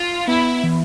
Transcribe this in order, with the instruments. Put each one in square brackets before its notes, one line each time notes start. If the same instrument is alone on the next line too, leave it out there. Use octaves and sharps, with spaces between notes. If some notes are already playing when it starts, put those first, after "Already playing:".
Already playing: [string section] F4
[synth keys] B3 [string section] E4
[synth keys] E3